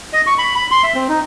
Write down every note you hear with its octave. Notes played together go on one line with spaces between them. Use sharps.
D#5
C#6
B5
B5
C6
E5
C4
D#4